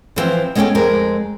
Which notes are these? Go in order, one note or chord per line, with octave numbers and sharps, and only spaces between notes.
D3 E3 F3 C4
G#3 B3 C#4 G#4 A4 G5
F2 G#3 A#4